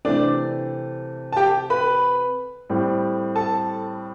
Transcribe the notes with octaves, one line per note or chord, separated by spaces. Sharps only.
C3 E3 A3 C4 D4 D5
A5
G4 G5
B4 B5
A2 G3 C4
A4 A5